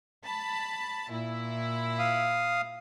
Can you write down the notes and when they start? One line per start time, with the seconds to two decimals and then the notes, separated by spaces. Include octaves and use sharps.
0.24 A5 B5
1.10 A#2 E4
1.99 F5 D#6